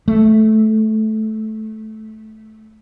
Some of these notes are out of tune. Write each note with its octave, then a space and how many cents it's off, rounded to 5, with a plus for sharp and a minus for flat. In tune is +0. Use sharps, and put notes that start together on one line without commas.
A3 -15